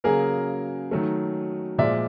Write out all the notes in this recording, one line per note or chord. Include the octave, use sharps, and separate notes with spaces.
C#3 F#3 A#3 G#4 A#4
D#3 F#3 A3
A#2 F3 G#3 D5 E5